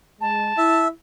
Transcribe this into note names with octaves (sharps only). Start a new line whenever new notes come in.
G#3 A5
E4 E5